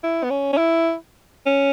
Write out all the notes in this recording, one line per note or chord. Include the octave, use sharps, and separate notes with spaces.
E4
B3
C#4
C#4
E4
C#4